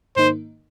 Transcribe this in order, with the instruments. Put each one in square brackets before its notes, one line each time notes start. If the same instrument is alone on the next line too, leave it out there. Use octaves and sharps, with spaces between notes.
[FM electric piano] G#2 D#3 A#3 D#4 [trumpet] C5